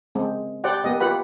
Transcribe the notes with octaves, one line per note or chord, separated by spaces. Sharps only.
G#3 C4
G4 C5 D5 F#5 G5
A#3 B3 G4 D#5
F4 G4 B4 F#5 B5